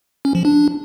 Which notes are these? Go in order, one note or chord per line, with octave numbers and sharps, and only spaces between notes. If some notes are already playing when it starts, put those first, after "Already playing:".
C#4
F3
D4